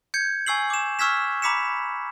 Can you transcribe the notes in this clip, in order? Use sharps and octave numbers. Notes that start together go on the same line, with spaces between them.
G6 G#6 C#7
G#5 C#6 E6 C7 F#7
D6 E7
C#6 E6 F6 G#6 B6 E7
A#5 B5 D6 B6 C#7 E7